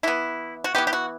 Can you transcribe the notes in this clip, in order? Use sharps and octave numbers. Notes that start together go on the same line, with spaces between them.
E3 B3 E4
F#4
E3 B3 G4
G4
F#4